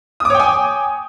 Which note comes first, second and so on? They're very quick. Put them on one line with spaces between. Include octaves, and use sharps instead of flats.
D#6 D6 C#5 G5 G#5